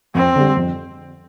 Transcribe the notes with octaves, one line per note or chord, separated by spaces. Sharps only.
F2 C4
D3 G3
F2